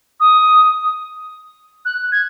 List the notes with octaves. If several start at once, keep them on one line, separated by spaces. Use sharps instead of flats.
D#6
F#6
G#6